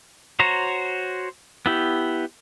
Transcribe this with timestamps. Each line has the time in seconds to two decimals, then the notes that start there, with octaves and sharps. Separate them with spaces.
0.39 F#4 C5 C#5 A#5
1.66 B3 E4 G4